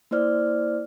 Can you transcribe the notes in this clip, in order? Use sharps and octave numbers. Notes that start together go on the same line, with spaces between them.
A#3 E4 C5 D5 F6